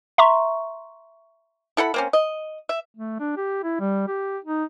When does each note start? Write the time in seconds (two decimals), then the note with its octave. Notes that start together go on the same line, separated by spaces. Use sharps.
0.18 E5 A#5 C6 C#6
1.77 E4 A4 F#5 B5
1.94 A#3 C4 C#4
2.13 D#5
2.69 E5
2.95 A3
3.20 D4
3.37 G4
3.63 E4
3.80 G3
4.08 G4
4.45 D#4